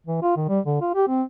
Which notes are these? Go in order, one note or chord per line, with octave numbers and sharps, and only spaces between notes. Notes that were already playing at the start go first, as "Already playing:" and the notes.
E3
F4
D#3
G3
D3
F4
G4
C4